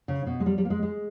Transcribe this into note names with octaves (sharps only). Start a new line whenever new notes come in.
C#3
B2
G#3
G3
G3
A#3
G#3
G#3